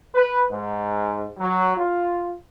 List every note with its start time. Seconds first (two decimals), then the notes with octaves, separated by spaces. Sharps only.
0.15 B4
0.51 G#2
1.39 F#3
1.77 F4